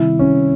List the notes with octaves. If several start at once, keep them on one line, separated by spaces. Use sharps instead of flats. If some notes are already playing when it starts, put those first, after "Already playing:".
Already playing: C3 D#3 G3 C4 E4
C#4